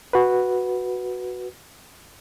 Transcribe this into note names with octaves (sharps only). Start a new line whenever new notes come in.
F#4 B4